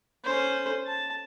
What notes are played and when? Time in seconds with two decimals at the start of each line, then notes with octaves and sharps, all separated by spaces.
0.25 C#4 C5
0.86 A5